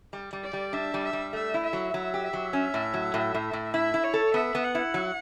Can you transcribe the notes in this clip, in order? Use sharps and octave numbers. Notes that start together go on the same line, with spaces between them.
G3
G3
D5
G3
D4 E5
G3
E5
G3
A3 E5
E4
E5
F#3
F#3 E5
G4
E5
F#3
C#4
A2
F#3
A2
A2
A2
E4 E5
E4
C#5
A4
B3 E5
B3
F#5
E4
F#3